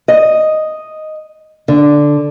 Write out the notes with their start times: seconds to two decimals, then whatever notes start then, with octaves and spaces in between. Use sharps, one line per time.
0.08 D#5
1.68 D3